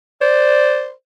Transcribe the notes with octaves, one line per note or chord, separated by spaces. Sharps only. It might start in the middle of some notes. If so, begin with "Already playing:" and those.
C5 D5